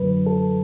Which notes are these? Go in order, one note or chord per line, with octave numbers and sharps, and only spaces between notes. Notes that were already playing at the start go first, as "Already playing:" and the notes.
Already playing: F#2 D3 F#3 B4
A4